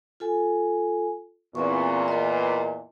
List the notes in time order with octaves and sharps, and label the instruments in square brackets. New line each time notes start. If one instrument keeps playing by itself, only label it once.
[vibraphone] F4 A4 G#5
[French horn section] E2 A#2 [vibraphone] C4 C#6
[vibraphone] A#4 D#5